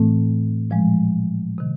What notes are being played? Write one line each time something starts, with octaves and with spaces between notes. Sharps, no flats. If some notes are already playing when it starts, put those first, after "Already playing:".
Already playing: A2 E3 A3 C4
A#2 F3 G#3
C3 D#3